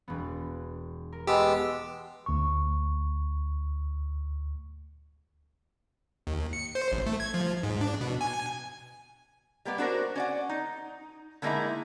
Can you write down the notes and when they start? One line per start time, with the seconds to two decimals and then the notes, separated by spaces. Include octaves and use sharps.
0.08 E1 B3
1.12 A#4
1.27 G#3 B3 G4 A5 C6 E6
2.26 D2 C#6
6.27 D#2
6.53 C#7
6.75 C5
6.92 A1
7.06 A3
7.20 G#6
7.34 F3
7.63 G#2
7.81 D4
8.01 B2
8.21 G#5
9.65 G3 A#3 B3 D5
9.78 D4 F#4 A4 A#4 C5
10.15 C#4 D5 F#5
10.49 D#4
11.42 D3 G#3 A#3 D#4 E4 A#5